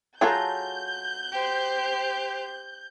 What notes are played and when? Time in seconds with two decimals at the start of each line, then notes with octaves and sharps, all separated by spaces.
0.21 F#3 F4 G#4 A4 A#5 G6
1.32 G4 C5